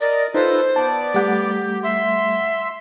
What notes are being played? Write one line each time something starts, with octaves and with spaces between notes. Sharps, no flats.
A#4 D5 D#5
D#4 F4 A4 B4 C5
B3 D5 A5
G3 A3 G4 F#5
E5 C6